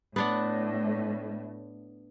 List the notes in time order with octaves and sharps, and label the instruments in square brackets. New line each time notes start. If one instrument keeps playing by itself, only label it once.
[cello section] A2 [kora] B3 D4 F#5